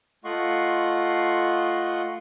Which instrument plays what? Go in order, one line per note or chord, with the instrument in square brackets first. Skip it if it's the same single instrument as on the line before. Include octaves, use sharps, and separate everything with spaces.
[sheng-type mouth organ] A3 F4 D#5 F#5 C6 C#6